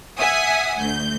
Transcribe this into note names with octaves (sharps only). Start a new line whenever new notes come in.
E5 F#5 G#5 D#6
D2 G6